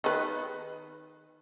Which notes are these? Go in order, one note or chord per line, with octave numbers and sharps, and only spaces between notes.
D#3 B4